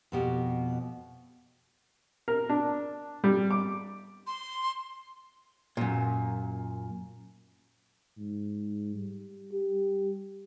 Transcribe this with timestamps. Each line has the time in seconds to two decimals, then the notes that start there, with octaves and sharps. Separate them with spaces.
0.12 F2 B2 G4
2.28 A#4
2.49 D4
3.24 G3
3.51 D6
4.27 C6
5.77 F#2 A#2
8.18 G#2
8.95 G3
9.52 G4